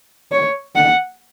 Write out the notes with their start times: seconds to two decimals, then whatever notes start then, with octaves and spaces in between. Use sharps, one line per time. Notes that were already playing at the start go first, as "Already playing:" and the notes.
0.32 C#5
0.76 F#5